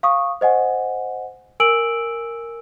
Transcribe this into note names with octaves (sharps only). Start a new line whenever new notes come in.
F5 C#6 D#6
C5 D#5 F#5 G#5
A#4 G#5 E6 D7 F#7